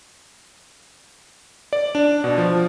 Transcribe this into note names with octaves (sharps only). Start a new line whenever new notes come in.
D5
D4
B2
F3